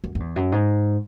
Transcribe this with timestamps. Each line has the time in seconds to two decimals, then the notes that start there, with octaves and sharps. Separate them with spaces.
0.04 F#2
0.15 F#2
0.20 E2
0.36 F#2
0.52 G#2